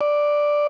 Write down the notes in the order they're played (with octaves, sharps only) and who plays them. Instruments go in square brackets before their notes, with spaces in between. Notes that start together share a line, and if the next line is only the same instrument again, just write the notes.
[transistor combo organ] D5